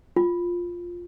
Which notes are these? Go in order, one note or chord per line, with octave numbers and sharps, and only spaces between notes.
F4